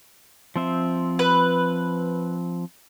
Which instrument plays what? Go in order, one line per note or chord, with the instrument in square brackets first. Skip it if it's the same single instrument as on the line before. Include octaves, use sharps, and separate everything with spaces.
[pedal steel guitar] F3 C4 E5
[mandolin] B4